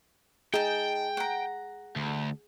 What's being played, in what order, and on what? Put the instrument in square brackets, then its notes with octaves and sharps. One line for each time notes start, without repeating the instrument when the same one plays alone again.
[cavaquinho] D#4 A5 [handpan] G#4 [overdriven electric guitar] G5
[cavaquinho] F#5 A#5
[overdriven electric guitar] D2